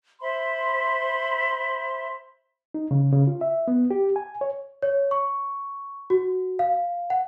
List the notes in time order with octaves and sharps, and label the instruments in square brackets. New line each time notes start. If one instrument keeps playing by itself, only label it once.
[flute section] C5 E5 B5 C6
[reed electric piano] D#4
C#3
C#3
F4
E5
B3
G4
G#5
C#5
[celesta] C#5
C#6
F#4
F5
F#5